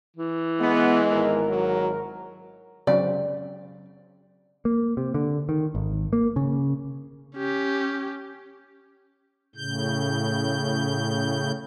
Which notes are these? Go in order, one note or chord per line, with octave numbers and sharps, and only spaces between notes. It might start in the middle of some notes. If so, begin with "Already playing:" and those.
E3
G#3 B3
G#1 A#4
F#3
C#3 F#3 C4 D5
A#3
C3
D3
D#3
G#1
A#3
C#3
C#4 G4
A2 C#3 G6